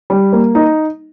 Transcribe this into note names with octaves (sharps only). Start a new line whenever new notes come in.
G3
A#3
D#4